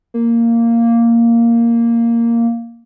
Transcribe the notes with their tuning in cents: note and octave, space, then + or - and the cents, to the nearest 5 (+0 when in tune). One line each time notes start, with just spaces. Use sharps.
A#3 -5